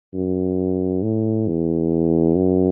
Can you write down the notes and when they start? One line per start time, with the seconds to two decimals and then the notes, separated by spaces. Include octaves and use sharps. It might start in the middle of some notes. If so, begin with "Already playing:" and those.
0.13 F#2
1.03 A2
1.47 E2
2.36 F#2